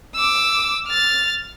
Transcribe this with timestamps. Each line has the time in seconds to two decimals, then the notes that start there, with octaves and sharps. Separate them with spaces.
0.16 D6 E6
0.88 F6 A6